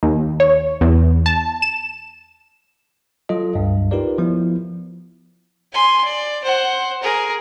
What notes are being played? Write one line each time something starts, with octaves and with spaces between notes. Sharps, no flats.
D#2
C#5
E2
A5
E7
F#3 F4 A4 D#5
C#2 G2
D#4 F4 G4 A#4 B4 D5
F3 B3 E4
G#5 C6
D5
C5 F#5
G#4 A#4